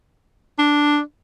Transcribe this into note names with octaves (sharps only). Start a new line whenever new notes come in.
D4